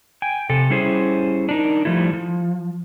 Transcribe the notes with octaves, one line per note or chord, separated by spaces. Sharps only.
G5 G#5
C3 A4
G3 C#4 E4 G#4 C5
D4 D#4 A#4
F3 G3 A3 E4
F3